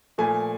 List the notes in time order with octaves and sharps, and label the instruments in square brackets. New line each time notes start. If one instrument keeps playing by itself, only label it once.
[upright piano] A#2 F3 A3 G#5